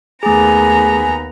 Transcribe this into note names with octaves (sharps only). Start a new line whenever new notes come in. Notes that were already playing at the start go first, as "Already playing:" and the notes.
D#2 A3 B3 G#4 G#5 A#5